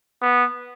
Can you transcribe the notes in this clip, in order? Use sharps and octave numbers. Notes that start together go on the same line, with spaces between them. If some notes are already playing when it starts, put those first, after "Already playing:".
B3